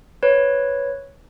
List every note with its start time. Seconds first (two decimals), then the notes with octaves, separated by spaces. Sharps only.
0.23 B4 C#5